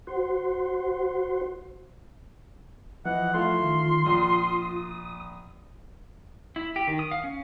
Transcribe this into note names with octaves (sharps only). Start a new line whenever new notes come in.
F#4 C5
E3 F3 D#5 F#5
A3 E4 F4 F5 C6
D#3
A#1 D#6
E4
G4
D#3
D#6
F5
C#4